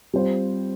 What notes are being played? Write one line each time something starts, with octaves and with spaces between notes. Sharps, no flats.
G3 C4 F4 C5